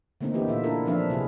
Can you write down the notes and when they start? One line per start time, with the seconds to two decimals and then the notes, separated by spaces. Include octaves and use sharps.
0.21 D3 A3 A#3 C4 D#4
0.34 E3 B3 E4 G4
0.47 A#2 F4 E5
0.63 D4 E4 F4 A4 A#4
0.86 E3 F3 C4 D4 E5 F5
1.10 C3 E4 G4 G#4